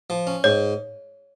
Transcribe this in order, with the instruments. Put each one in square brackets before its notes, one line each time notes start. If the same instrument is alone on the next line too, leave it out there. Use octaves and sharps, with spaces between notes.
[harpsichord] F3
C#4
[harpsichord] G#2 [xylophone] C#5